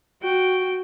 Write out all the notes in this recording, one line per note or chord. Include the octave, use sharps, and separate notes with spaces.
F#4 G5